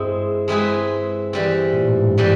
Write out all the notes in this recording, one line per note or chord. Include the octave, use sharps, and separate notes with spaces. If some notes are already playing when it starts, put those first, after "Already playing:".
Already playing: G2 G#3 C4 E4 G#4
G#3 C4 E4 G#4 B4
E3 G3 C4
A#2
A2
G#2
G2
E3 G3 C4